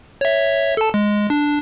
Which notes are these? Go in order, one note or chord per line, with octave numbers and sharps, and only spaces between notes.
C#5 E5
A4 A5
G#3
D4